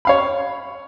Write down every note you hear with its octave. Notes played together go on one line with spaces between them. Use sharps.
C#5 F5 B5